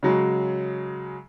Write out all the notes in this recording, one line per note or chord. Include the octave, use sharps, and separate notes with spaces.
C#3 F#3 G#3